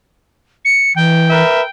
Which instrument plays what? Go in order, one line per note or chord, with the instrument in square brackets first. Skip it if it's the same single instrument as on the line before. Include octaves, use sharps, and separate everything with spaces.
[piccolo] C#7
[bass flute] E3 [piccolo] G5
[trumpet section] A#4 B4 E5